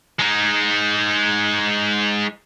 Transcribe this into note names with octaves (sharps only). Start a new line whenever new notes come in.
G#3 D#4